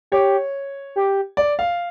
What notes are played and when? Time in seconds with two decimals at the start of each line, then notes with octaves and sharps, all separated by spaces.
0.12 G4 C#5
0.96 G4
1.37 D5
1.59 F5